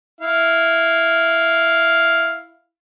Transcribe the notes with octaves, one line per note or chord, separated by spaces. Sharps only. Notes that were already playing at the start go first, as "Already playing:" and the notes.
E4 F5